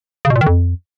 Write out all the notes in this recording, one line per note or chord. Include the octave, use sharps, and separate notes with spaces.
C#3
B2
A#2
D#3
F2